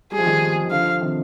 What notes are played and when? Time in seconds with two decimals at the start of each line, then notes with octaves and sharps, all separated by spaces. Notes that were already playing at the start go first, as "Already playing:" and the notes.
0.11 G3 G#4
0.18 F3
0.26 D#3 G3
0.65 D#3
0.71 D3 F3 F5
1.01 C3 D#3